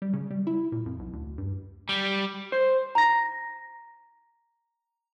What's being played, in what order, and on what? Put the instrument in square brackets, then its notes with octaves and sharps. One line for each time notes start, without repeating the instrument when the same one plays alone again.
[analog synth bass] G3
C#3
G3
E4
A#2
F2
B1
D2
G2
[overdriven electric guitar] G3
[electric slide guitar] C5
[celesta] A#5 A#6